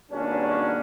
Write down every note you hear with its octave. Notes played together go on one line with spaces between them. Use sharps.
G#1 G2 B2 A#3 C#4 D4